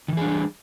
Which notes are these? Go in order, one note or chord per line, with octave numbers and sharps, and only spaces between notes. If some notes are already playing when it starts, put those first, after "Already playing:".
D#3 E3 G3 D4 G#4